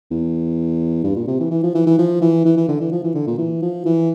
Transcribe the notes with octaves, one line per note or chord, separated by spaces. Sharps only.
E2
G2
A#2
C3
E3
E3
F3
E3
E3
F3
E3
E3
E3
D3
E3
F3
E3
D3
A#2
E3
F3
E3